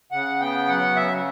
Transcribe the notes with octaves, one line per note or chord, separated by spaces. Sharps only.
C#3 F#5
B3 G5
F#3 F#5
C#3 E5